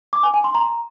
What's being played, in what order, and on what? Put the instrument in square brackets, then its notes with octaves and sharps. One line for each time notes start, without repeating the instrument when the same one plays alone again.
[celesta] D6
G#5
G#5
C6
A#5